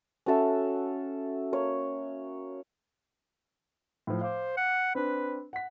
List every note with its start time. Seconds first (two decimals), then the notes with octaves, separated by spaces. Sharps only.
0.26 C#4 F#4 A4 E5
1.53 A#3 C#5
4.07 A2 F3
4.21 C5 F5 D6
4.57 F#5
4.95 C4 D4 B4
5.53 F#5 B6